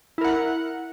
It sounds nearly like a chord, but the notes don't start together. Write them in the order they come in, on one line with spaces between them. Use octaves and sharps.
E4 A#4 F#5